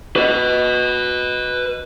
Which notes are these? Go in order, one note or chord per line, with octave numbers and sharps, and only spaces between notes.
B4 D#5